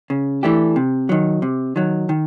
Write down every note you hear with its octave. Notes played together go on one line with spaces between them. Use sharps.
C#3
E3 A3 D4 G4
C3
D#3 F#3
C3
D#3 F#3
D#3